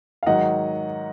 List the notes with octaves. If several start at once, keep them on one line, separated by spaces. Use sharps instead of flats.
F5
G#2 D#3 F#3 D#5 F#5